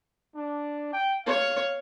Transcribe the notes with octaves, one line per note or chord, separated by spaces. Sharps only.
D4
G5
C#5 F5